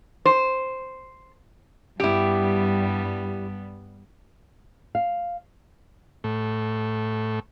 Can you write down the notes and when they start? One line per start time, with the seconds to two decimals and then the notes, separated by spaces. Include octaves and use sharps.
0.25 C5
2.00 G2 G3 B3 E4 G4
4.95 F5
6.24 A2